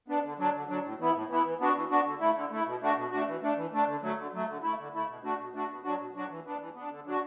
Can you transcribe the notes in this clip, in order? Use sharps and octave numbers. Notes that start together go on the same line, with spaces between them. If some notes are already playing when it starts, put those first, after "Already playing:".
B3 D4
D3
F#3 D4
D3
F#3 D4
A2
E3 B3 E4
A2
E3 B3 E4
E3
B3 D4 F#4
E3
B3 D4 F#4
D3
A3 E4
D3
A3 E4
B2
A3 D4 F#4
B2
A3 D4 F#4
E3
A3 D4
E3
A3 D4
D3
F#3 A3
D3
F#3 A3
D3
A3 E4
D3
A3 E4
B2
A3 D4 F#4
B2
A3 D4 F#4
B2
F#3 D4 F#4
B2
F#3 D4 F#4
E3
B3 D4
E3
B3 D4
D3
F#3 D4 F#4